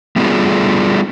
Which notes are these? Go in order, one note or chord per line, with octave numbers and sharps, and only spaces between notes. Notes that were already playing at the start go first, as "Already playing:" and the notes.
G3 A3 B3 D4 F4 G#4